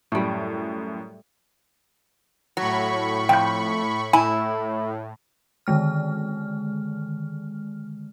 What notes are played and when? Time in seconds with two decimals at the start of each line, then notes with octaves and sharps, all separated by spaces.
0.12 F#2 A2 G3 A3
2.57 A2 F#3 B5 C#6
3.29 F2 G5 G6
4.13 A2 E4 G#5 B5
5.67 D3 D#3 G#3 F6